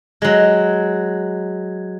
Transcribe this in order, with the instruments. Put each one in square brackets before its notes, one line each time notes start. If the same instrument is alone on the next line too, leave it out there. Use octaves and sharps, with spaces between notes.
[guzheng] F#3 G#3